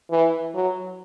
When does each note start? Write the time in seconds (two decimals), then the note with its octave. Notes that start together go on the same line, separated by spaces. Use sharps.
0.10 E3
0.54 F#3